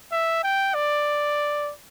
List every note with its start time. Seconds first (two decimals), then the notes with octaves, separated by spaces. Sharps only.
0.12 E5
0.43 G5
0.74 D5